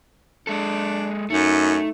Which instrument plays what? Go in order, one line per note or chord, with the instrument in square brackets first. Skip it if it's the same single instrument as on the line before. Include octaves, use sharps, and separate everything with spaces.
[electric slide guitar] G#3 A4 [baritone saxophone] D4
[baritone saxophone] F#2 [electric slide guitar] A3 [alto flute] D#4